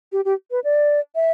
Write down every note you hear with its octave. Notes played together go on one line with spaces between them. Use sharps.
G4
G4
B4
D5
E5